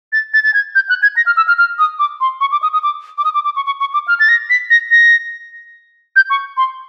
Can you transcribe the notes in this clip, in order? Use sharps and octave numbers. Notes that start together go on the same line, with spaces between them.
A6
A6
A6
G#6
G6
F#6
G#6
A#6
F6
E6
F6
F6
D#6
D6
C6
C#6
D6
D#6
D#6
D6
D6
D#6
D6
D6
C#6
C#6
C#6
D6
F6
A6
A#6
B6
A#6
A#6
G6
C#6
C6